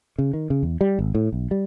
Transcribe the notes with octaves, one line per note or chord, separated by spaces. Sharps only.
C#3
D#3
C#3
E2
G3
G#1
A2
B1
G3